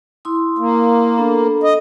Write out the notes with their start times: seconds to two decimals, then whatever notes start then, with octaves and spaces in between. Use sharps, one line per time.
0.25 E4 C6 D#6
0.58 A#3
1.17 B3 D4 A4
1.63 D#5